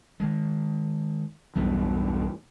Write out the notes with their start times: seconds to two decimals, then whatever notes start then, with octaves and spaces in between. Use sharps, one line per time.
0.20 D#3 G#3
1.56 B1 E2 G2 F#3 B3